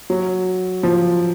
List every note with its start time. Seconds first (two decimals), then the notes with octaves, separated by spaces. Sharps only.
0.10 F#3
0.83 F3